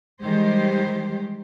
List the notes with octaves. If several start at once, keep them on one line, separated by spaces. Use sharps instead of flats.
D#3 E3 G3 G#3 G4 C5